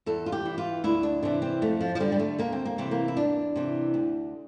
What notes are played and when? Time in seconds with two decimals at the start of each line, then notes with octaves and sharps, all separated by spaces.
0.06 E2 A4
0.26 F4
0.32 G4
0.45 E3
0.58 F4
0.84 D2 E4
1.03 D4
1.22 C3 E3 D4
1.42 C4
1.62 F2 A3
1.81 F3
1.95 F3
2.00 D3 G3
2.12 G3
2.19 A3
2.38 D2 A#3
2.52 C4
2.65 A#3
2.78 C3 E3 C4
2.91 A#3
3.08 E4
3.16 E2 D4
3.56 C3 E3
3.94 D2